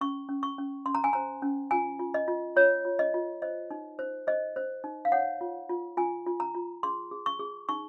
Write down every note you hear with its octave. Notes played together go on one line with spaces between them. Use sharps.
C#4 C#6
C#4
C#6
C#4
C#4 C6
A#5
G#5
C5 A#5
C#4
F4 G#5
F4
D#5
F4
F4 C#5
F4
D#5
F4
C5 D#5
D#4
C5
C5 D#5
C5
D#4
F5
C#5 F#5
F4
F4
F4 G#5
F4
A#5
F4
G#4 C6
G#4
C#6
G#4
D#4 C#6